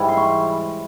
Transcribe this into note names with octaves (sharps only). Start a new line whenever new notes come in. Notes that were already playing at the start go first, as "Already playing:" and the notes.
Already playing: G#2 E3 G3
C6
C#6